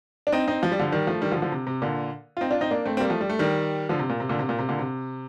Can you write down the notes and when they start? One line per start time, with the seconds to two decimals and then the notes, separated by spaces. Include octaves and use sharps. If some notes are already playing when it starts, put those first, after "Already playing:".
0.27 D4
0.32 C4 D#4
0.48 C4 D#4
0.63 F3
0.72 G3
0.80 D3 F3
0.92 D#3 G3
1.07 F3 A3
1.22 D#3 G3
1.32 D3 F3
1.42 D3 F3
1.52 C3
1.67 C3
1.82 A#2 D3
2.37 F4
2.41 C4 D#4
2.51 D4 F4
2.61 C4 D#4
2.71 A#3 D4
2.85 A3 C4
2.97 C4
3.00 G3 A#3
3.10 F3 A3
3.21 G3
3.30 A3
3.39 D#3 G3
3.89 D3 F3
3.99 C3
4.09 A#2
4.20 C3
4.29 A#2 D3
4.39 C3
4.49 A#2
4.59 C3
4.69 A#2 D3
4.79 C3